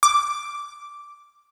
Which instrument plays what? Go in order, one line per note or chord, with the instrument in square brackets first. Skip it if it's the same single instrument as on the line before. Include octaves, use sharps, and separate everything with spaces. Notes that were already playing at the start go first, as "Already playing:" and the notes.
[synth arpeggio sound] D6